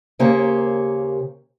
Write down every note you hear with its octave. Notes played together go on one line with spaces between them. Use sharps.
D#2 C#3 A#3 G4 C5 C#5